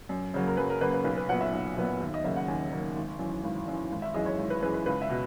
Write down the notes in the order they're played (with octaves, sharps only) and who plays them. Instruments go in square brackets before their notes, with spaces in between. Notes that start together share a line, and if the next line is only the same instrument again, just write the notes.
[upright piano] F#2
C#3 F#3 A#3
A#4
F#2 B4
A#4
C#3 F#3 A#3 B4
B4
B1 B4
B4
A#2 F#3 B3 F#5
E5
B1
A#2 F#3 B3
D#2
D#5
C#3 F#3 A#3 E5
F#5
D#2 G#5
C#3 F#3 A#3
G#1
F#2 E3
G#1
F#2 E3
G#1
E5
F#2 E3 G#3 D#5
C#5
G#1
B4
F#2 E3 G#3 B4
B4
C#2 B4
E5
B2